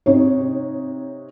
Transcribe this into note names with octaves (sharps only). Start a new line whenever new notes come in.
C3 D#4 C#5